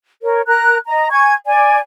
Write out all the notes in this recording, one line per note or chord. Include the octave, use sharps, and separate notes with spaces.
A#4 C#5
A#4 A#5 F#6
D#5 A#5
G#5 C#6 G#6
D5 G#5